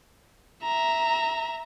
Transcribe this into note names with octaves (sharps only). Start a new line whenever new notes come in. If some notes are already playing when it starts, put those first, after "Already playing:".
E5 A#5